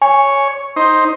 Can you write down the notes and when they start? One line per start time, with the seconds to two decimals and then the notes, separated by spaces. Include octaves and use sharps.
0.02 C#5 G#5
0.76 D#4 C5